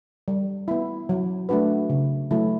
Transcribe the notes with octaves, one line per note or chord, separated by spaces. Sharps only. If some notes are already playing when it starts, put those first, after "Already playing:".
G3
B3 E4
F#3
A3 D4 F#4 B4
C#3
F#3 A3 E4